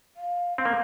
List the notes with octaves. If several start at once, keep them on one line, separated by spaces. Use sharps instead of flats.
F5
C4 F5
A#3